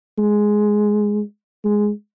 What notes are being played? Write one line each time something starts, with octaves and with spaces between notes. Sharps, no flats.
G#3
G#3